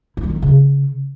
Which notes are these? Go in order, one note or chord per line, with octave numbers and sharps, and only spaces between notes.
E4
G3
D#3
A3
C#3